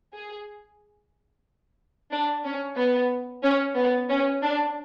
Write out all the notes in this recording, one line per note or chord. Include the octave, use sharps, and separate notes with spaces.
G#4
D4
C#4
B3
C#4
B3
C#4
D4